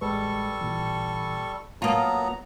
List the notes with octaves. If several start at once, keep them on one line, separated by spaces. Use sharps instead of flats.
A1 G3 G#3 A4 B4 C#6
A1 A#2 E3
F#3 A#3 B3 F4 A5 A#5 D#6